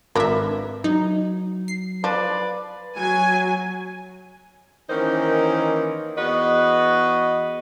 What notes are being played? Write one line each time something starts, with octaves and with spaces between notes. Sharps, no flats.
G#1 D4 A#4 B4 E5
F#3 D#4
C7
F3 B4 D5
F#3 G#5
D#3 E3 A#3 C#4 D#4 C5
E2 B3 F#4 B4 D#5